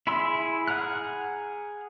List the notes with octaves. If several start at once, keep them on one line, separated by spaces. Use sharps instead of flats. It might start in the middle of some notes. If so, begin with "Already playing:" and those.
E4 G#4 B5 C6 E6
G#4 F#5 A#5 F6 F#6